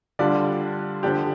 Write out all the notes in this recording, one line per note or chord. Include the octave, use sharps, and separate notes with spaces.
D3 G3 D4 F4 D5
D3 F3 D4 G4